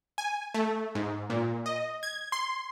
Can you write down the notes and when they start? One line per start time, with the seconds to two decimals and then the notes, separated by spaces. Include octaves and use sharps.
0.18 G#5
0.54 A3
0.95 G#2
1.30 A#2
1.66 D#5
2.03 G#6
2.32 C6